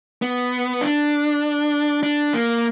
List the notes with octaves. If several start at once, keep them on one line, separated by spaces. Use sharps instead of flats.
B3
D4
D4
A#3